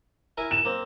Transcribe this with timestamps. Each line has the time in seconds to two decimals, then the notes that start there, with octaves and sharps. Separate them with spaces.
0.37 E4 A#4 G#5
0.51 E7
0.65 A#3 C4